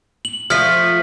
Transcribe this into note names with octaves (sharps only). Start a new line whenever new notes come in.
F#7
F3 A3 F6 B6